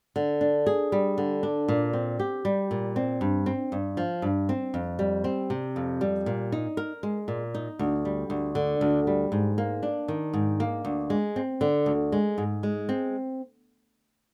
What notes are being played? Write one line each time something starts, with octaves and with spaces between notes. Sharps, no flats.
D3
D4
G#4
G3
D3
D4
A#2
C4
G4
G3
A#2
C4
G2
C4
G2
F3
G2
C4
F2
G3
C4
C3
F2
G3
A#2
D#4
A#4
G#3
A#2
D#4
D2
G3
D2
D3
D2
G3
G#2
A#3
D4
D#3
G#2
A#3
D2
G#3
C4
D3
D2
G#3
G#2
G#3
C4